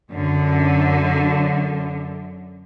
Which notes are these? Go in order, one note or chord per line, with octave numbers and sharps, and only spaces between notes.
F#2 D3